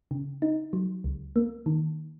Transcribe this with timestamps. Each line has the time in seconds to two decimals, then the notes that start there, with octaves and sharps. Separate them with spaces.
0.11 C#3
0.42 D#4
0.73 F#3
1.04 C#2
1.36 A#3
1.66 D#3